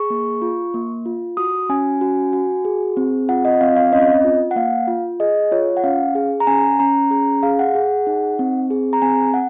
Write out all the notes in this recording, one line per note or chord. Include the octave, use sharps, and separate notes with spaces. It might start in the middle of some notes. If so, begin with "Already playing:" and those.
Already playing: G#4 C#6
A#3
F4
A#3
F4
F#4 D#6
C#4 G#5
F#4
F#4
G#4
C4
F4 F#5
D#5
C4 F5
F5
C#4 D#5
F4
F#5
A#3 F5
F4
G#4 D#5
F4 C#5
F#5
C#4 F5
G#4
A#5
C#4 G#5
C#4 A#5
G#4 A#5
G#4 F5
F#5
G#4
D#4
C4
G#4
A#5
C4 G#5
F#5